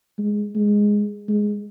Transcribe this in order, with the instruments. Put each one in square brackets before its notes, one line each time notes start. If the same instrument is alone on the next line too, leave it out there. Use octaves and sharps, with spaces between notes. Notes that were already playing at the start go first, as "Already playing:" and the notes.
[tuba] G#3
G#3
G#3